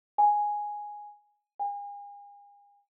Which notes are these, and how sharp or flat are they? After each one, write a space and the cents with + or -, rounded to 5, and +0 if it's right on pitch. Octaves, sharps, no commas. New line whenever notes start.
G#5 +0
G#5 -40